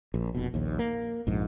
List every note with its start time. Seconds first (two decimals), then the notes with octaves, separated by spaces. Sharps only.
0.14 A#1
0.35 F1 B2
0.54 A#1 D#2
0.79 A#3
1.27 A#1 F2 G#2